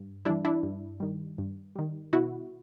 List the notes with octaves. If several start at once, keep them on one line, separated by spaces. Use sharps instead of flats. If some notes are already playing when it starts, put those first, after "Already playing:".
Already playing: G2
E3 G3 D4 E4
D4 E4
G2
D#3 G3
G2
D#3 G3
B2 E4 F#4